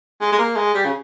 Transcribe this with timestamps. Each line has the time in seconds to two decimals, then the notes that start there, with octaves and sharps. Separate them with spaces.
0.21 G#3
0.32 G#3
0.39 A#3
0.56 G#3
0.74 G3
0.85 C#3